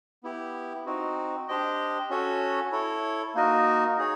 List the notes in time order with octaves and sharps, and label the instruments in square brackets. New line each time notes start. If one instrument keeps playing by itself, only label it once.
[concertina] B3 E4 G4
C4 D#4 F#4
D4 G4 C5 D#5 G5
C#4 F#4 A4 C#5
E4 A4 C#5
A#3 D#4 F#4 A#4 D#5
D#4 G#4 C#5